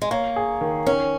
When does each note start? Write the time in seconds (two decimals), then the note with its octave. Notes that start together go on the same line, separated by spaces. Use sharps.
0.02 G#3
0.11 A#3 C#5
0.36 G#4
0.61 D#3
0.86 D#3 C#4